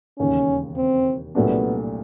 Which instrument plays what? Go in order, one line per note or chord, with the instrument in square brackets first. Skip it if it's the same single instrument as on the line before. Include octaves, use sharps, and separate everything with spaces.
[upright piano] E1 D#2 C#3 [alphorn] C#4
[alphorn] C4
[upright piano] C2 A#2 F#3 A3 D4 [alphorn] B3